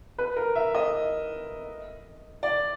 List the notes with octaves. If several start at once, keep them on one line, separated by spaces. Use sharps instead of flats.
B4
A#4
E5
D#5
D5